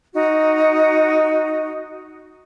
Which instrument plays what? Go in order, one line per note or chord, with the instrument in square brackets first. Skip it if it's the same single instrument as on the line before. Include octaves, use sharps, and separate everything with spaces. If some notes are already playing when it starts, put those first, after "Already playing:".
[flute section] D#4 F#4